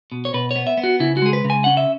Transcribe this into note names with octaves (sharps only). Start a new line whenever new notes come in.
B2
C#5
B2 B4
B3 C#5
E5
B3
F#4
C#3 E4
F#4
G#3 G#4
B4
C#3
G#5
C#4 F#5
E5